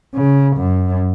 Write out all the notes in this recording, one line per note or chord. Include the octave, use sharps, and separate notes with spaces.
C#3
F#2